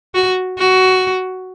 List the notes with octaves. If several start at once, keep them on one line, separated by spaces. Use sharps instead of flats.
F#4
F#4